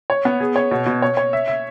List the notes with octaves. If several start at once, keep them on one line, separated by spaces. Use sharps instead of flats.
C#5
B3
G#4
C#5
B2
B2
C#5
C#5
E5
E5